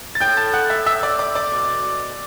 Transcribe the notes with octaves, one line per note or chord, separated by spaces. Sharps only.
A6
A2 G5 G6
A5 A6
F#5 F#6
E5 E6
E5 E6
D5 D6
D5 D6
D5 D6
B2